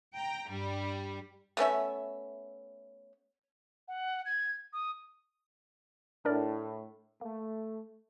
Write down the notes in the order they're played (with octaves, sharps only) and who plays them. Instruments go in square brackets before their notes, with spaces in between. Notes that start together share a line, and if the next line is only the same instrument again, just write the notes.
[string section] G5 A#5
G2 G3
[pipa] A3 B3 C#4 E5
[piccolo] F#5
G#6
D#6
[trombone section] A2 [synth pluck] D4 A#4 D5
[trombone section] A3 [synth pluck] A#3